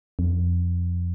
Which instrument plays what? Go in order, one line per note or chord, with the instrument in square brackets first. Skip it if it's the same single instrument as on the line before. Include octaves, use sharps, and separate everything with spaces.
[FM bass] F2